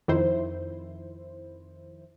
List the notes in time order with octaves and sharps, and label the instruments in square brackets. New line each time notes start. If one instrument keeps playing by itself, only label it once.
[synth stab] F2 D#3 E4 C5